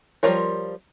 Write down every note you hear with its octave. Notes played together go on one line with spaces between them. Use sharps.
F3 G3 F4 A#4 C#5